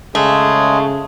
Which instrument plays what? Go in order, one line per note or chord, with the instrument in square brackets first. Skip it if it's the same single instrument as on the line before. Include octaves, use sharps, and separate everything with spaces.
[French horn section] C#3 [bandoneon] G#3 G#4 [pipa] A3